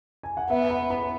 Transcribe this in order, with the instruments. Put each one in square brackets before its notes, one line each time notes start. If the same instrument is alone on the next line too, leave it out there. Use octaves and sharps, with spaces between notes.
[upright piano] G#5
F#5
[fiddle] B3 [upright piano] E5
[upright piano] B5
B5